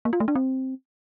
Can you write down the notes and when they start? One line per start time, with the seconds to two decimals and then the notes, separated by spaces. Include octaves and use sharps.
0.05 A#3
0.13 F4
0.20 A3
0.28 D4
0.35 C4